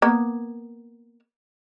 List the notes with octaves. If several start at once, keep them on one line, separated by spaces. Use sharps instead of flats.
A#3 B3